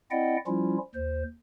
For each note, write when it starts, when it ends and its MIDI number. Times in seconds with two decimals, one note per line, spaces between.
0.11 0.37 60
0.11 0.37 64
0.11 0.37 74
0.11 0.37 75
0.11 0.37 78
0.11 0.37 79
0.47 0.78 53
0.47 0.78 55
0.47 0.78 61
0.47 0.78 64
0.47 0.78 65
0.95 1.23 39
0.95 1.23 72